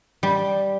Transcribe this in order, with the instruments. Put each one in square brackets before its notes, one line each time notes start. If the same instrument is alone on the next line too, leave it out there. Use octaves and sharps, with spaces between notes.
[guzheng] G3